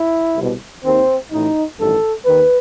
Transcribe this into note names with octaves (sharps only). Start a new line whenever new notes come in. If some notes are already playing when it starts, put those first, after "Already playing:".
Already playing: E4
C2 B2
D#2 D#3 C4
A1 A2 E3 D#4
A1 G2 D#3 A4
D#2 D#3 B4